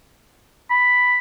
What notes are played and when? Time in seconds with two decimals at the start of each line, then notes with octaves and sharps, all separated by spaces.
0.71 B5